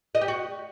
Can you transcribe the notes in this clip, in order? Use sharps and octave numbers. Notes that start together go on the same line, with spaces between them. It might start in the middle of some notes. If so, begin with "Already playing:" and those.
D#5
G4
F#4